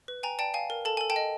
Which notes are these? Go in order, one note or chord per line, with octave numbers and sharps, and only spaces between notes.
B4
G5 G#5 A#5
D5 G5 A5
F5 G#5
A#4
A4 A5
A4 G#5
G5 A5
D#5